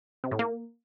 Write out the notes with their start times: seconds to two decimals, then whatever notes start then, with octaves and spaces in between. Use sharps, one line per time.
0.24 C3
0.31 A2
0.39 A#3